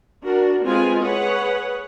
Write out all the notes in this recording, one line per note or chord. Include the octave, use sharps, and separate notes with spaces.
D4 F#4 A#4
G#3 C4 F4 B4 G#5
G#4 B4 C#5 F#5